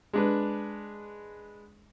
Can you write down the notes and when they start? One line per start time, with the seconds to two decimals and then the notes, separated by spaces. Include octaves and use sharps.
0.13 G#3 D4 B4